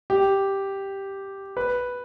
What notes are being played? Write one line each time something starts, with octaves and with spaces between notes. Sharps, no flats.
G4
B4